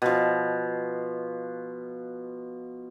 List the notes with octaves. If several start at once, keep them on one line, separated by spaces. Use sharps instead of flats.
B2 F3